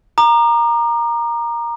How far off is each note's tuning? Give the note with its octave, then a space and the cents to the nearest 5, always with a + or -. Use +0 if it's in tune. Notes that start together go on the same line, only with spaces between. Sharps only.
A#5 +5 D6 +45